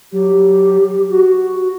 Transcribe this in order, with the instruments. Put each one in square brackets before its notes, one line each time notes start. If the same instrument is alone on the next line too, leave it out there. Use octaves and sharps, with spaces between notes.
[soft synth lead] F#3 [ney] G4
[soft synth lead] F#4